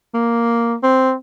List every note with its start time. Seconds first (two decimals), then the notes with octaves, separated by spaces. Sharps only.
0.14 A#3
0.83 C4